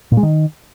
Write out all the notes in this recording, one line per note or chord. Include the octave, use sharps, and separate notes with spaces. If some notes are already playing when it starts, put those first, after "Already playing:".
A#2
G#3
D#3